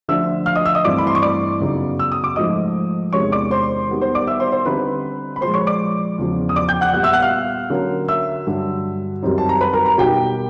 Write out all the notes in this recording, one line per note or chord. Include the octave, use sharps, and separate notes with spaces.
D3 F3 A3 D4 E5 E6
F5 F6
D#5 D#6
E5 E6
D#5 D#6
G2 E3 A3 C4 D5 D6
B5
C6
C#6
D5 D6
F#2 C#3 F#3 B3 D#4
E6
D#6
D6
G#2 F3 A3 D#5 D#6
E2 C3 D#3 G#3 C#4 C#5 C#6
D5 D6
C5 C6
D#3 G3 B3
C5 C6
D5 D6
E5 E6
C5 C6
C5 C6
D3 G3 C4 D#4 B4 B5
B5
A#2 F3 G#3 C5 C6
C#5 C#6
D5 D6
E2 C#3 F3
D#6
D5 D6
G5 G6
F#5 F#6
A#2 G3 B3 F#5 F#6
E5 E6
F#5 F#6
F5 F6
D3 F#3 A#3 C#4
E5 E6
G2 D3 F#3
F#2 D#3 G3 C4 D#4
A5
A#5
B4 B5
A#4 A#5
A#4 A#5
B2 G3 A#3 D#4 G4 G5